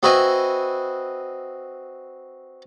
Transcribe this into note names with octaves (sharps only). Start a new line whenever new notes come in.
C4 F#4 B4 D#5 E5 G#5